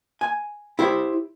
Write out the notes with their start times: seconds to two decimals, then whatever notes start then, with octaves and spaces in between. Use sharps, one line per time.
0.21 G#5
0.79 E4 G4 C5